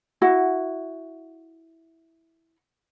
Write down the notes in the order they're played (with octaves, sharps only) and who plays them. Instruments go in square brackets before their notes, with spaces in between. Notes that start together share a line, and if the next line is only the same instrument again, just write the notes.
[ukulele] E4 F#4 F#5